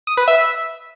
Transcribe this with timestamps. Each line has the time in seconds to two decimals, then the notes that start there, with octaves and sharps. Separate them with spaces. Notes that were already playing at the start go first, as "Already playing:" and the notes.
0.07 D#6
0.17 B4
0.28 E5